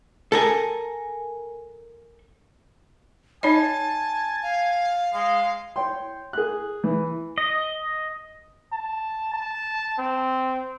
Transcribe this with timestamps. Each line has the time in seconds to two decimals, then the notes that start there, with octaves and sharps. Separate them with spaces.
0.32 A4 A#4 G#5
3.43 D#4 C#5 D#5 G#5 A5
4.43 F5
5.14 G#3 F5
5.76 C#5 G5 C6
6.33 G#4 F#6
6.84 E3
7.38 D#5
8.73 A5
9.34 A5
9.99 C4